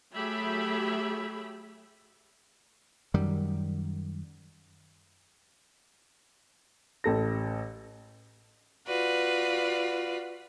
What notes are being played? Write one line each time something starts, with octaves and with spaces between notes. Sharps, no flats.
F#3 A3 G4 G#4 E5 B5
F#2 D#3 G3
A1 A4 A#6
F4 F#4 B4 D5